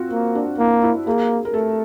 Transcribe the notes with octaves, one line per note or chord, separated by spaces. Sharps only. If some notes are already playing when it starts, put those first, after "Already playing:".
Already playing: C4 F4 F#4
A#3
D4
A#3 E4
E4
A#3 G#4
A#4
A3 A4